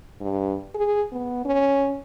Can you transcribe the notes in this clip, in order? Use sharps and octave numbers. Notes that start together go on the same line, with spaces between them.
G2
G#4
B3
C#4